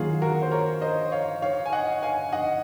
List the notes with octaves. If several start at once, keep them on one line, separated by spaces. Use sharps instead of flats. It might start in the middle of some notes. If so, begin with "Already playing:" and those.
Already playing: D#3 F#3 A#3 D#4 F4 F#4 G#4
F#4 A#4
C5
A#4 C#5
C5 D#5
C#5 F5
C#5 F5
G#5
D#5 F#5
F5 G#5
D#5 F#5